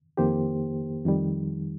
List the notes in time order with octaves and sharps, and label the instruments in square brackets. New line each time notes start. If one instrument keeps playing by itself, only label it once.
[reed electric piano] F2 D#3 A#3 G4 C5
F2 D#3 G3